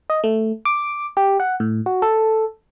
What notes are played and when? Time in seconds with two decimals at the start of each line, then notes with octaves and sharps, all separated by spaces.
0.10 D#5
0.24 A3
0.65 D6
1.17 G4
1.40 F#5
1.60 A2
1.86 F#4
2.02 A4